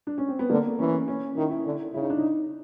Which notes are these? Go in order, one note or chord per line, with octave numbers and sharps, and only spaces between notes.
D4
C#4
C4
B3
D3 A#3
E3 C#4
C#4
D#3 E4
E4
D3
C#3 E4
D#4
D4
D#4